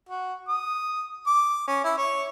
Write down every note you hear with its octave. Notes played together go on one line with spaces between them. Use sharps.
F#4
D#6
D6
C#4
E4
C#5